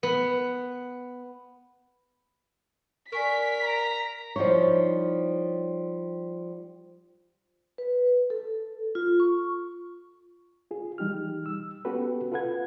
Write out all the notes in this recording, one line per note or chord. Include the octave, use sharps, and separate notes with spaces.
B3
A#4 D5 G#5 C#6 B6
A#5
F3 G3 D#4 E4 C#5
B4
A4
F4
C#6
F4 G#4
E3 G3 D#4 G4 F6
E6
B3 C#4 F#4 G4 A4 B4
F4 A4 B4 F#5 G#6